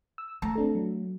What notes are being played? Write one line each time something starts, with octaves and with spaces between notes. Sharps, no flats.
E6
A3 A5 A#5
C4 D4 A4
F#3